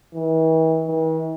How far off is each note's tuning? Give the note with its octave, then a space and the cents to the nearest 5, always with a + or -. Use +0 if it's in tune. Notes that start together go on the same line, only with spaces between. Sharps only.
E3 -40
E3 -45